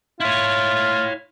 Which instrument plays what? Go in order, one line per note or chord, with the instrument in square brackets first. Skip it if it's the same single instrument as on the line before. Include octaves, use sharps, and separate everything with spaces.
[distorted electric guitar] E4 C#5 [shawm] F4